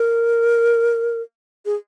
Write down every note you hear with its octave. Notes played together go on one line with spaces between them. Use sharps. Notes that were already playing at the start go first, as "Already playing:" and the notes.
Already playing: A#4
G#4